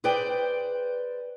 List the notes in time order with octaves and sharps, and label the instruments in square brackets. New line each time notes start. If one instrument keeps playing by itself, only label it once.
[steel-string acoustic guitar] G#4 B4 C5 D5 G5